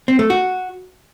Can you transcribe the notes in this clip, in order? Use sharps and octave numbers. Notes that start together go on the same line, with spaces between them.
C4
A3
F#4